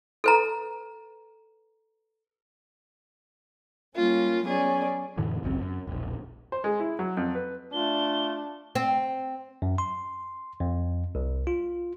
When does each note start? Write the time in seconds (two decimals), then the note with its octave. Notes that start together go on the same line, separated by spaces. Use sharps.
0.24 A4 B4 A#5
3.95 G3 A#3 C#4 F4
4.45 F#3 B3 C#4 G#4 D5
5.17 F2 A2 D3 E3
5.43 G#1 C#2 F#2 C4
5.61 F#2
5.87 E1 A#1
6.52 C5
6.64 G#3
6.80 E4
6.99 F#3
7.17 F2
7.35 B4
7.73 A3 D4 F4 G7
8.75 C4
9.62 F#2
9.78 C6
10.60 F2
11.15 C2
11.47 F4